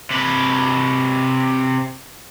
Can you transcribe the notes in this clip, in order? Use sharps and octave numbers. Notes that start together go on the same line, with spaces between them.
C3 B4